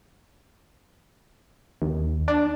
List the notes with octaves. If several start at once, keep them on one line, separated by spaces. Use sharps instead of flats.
D#2
D4